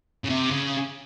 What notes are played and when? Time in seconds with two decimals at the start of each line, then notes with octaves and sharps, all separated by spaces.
0.24 C#3
0.30 C3
0.51 C#3